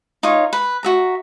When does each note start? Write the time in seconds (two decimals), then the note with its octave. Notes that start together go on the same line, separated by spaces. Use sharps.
0.23 D#4 F4 C#5
0.53 B4
0.83 F#4 E5 A#5